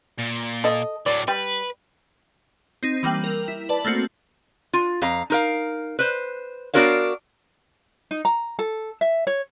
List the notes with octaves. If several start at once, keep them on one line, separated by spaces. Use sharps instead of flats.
A#2
A4 D#5
A2 F#3 D5
G3 B4
C4 D#4
E3 G3 A#3 G5 F#7
A#4
E4
B4 D5 A5
A3 A#3 C4 F#4
F4
F2 F5 A#5
D#4 A#4 F5
B4 C5
B3 D4 F#4 A#4 C#5 F5
D#4
A#5
A4
E5
C#5